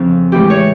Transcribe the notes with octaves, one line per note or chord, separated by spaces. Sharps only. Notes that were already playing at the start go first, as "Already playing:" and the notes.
Already playing: F2 C#3 F3 F4
A2 E3 G#3 G4
C#5